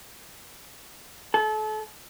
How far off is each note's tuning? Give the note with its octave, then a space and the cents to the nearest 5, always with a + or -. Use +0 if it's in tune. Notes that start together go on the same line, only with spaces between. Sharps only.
A4 -35